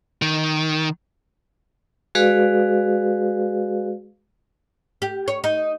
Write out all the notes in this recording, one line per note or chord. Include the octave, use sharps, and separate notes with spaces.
D#3
G#3 F#4 G#4 B4 D5 F5
G4
C#5
D#4